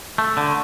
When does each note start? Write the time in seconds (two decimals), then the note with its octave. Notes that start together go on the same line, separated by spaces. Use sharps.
0.18 A3
0.37 D3